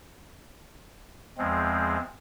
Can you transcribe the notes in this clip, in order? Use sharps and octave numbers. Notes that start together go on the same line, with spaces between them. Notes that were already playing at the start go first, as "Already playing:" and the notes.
E2 F3 G#3 C4